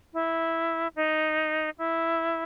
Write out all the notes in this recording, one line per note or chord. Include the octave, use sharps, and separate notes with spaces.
E4
D#4
E4